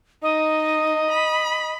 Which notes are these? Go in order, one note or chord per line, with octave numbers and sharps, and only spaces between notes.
D#4 D#5
B5